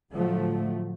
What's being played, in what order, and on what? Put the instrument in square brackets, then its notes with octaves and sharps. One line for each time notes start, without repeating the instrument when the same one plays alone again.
[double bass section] A2 D3 F3 F#3 A3